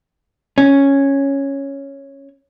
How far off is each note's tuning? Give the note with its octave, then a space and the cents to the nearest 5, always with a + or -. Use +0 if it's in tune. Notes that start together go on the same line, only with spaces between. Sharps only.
C#4 -5